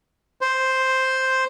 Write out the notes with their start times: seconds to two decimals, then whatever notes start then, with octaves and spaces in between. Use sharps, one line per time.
0.41 C5